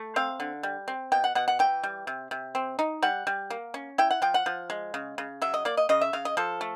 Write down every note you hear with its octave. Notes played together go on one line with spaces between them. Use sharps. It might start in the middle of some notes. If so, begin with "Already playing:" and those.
Already playing: A3
C4 F5
D3
G3
C4
B2 G5
F#5
B2 F#5
F#5
E3 G5
G3
C3
C3
C4
D#4
G3 F#5
G3
A#3
C#4
E4 G5
F#5
F3 G5
F#5
F3
G#3
C#3
C#3
F#3 E5
D#5
A#3 D5
D#5
C#3 D#5
E5
C#3 F5
D#5
F3 A4
A3